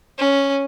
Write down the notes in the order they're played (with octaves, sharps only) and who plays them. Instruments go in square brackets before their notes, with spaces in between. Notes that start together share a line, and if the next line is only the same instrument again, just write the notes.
[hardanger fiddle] C#4